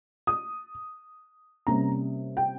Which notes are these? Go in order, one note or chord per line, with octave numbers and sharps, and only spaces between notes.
D#6
C3 G3 A#3 C#4 A#5
G5